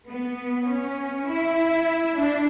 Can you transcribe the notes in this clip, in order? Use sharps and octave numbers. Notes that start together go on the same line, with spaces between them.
B3
C#4
E4
D4